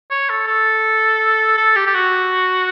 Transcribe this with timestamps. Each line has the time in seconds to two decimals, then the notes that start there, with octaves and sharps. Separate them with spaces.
0.11 C#5
0.29 A4
0.47 A4
1.57 A4
1.76 G4
1.86 G4
1.94 F#4